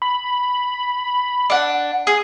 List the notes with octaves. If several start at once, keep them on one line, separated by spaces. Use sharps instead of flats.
B5
D4 F#5
G#4